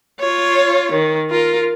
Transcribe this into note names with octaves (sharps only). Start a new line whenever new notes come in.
F4 C#5
D#3
F4 A#4